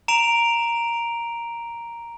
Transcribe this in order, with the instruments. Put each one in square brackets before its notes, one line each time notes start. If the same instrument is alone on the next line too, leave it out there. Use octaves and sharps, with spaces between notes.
[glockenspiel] A#5 D7 F7